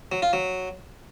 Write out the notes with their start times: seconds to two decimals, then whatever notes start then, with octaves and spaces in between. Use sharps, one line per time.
0.12 F#3
0.22 F4
0.33 F#3